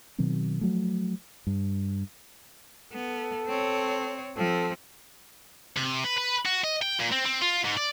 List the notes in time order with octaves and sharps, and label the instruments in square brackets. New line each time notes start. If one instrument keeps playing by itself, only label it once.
[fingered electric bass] B2 D#3 F#3 C4
F3 F#3 A3
G2
[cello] B3 [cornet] A4
[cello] C4 C#5
[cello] F3 C4 [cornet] A4
[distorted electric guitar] C3
B4
B4
F#4
D#5
G5
A#2
C4
C4
F4
G#2
D5